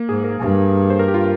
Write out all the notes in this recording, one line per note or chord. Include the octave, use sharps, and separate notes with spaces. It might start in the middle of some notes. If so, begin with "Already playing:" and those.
Already playing: A#3
G#2 G#4
A#4
G2
C5
A#4
G4
F4